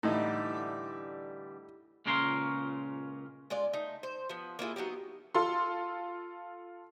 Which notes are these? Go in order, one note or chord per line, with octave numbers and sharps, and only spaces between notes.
A2 D3 E3 G3 D#4
C#2 A#2 C#3 C#4 A#4 C6
G#3 F4 D5
A3 D#4
C5
F3 B3
A#3 E4 F4 G#4
F#3 B3 D#4 G4
F4 A4 C6